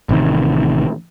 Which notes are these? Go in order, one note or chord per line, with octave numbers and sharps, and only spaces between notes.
A1 C3 D#3